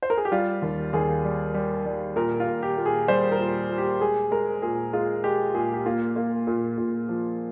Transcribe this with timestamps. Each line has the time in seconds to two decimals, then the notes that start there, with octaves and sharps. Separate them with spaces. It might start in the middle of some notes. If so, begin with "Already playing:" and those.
0.03 C5
0.10 A#4
0.17 G#4
0.25 G4
0.31 G3 F4
0.62 D#2
0.93 D#2 G#4
1.24 G3
1.54 G3
1.86 G3
2.16 A#2 A#4
2.40 F4
2.46 A#2
2.63 G4
2.77 A#2
2.86 G#4
3.08 G3 C5
3.32 A#4
3.39 A#2
3.70 A#2
3.78 G4
4.00 G#3 G#4
4.31 G#3 A#4
4.62 A#2 G#4
4.93 G#3 F4
5.24 G#3 G4
5.54 A#2 G#4
5.74 G4
5.86 A#3 F4
6.16 A#3
6.47 A#2
6.78 A#2
7.09 F3